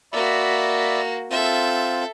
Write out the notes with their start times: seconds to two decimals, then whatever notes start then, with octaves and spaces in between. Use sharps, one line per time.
0.13 A#3 F#4 D5 E5 B5
1.31 C4 F4 A4 E5